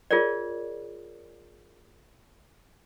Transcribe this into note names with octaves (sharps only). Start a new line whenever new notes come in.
F4 G#4 A#4 C#5 D5